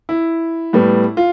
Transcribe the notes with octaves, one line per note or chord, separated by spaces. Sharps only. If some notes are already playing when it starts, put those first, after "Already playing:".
E4
A2 G3 B3
F4